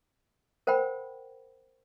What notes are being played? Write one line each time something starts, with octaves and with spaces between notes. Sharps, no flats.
A#4 C5 F#5 G5 B5